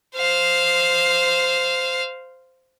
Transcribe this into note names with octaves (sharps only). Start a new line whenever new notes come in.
C5 F5